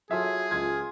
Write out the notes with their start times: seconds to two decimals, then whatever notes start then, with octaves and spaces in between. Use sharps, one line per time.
0.11 F#3 F4 G#4 A4 E5 G#5
0.51 C#2 G#3 F4 G#6